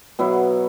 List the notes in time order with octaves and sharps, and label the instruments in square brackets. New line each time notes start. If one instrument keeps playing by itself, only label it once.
[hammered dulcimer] B2 F#3 E4